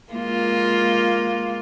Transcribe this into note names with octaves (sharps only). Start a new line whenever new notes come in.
G#3 A#3 F4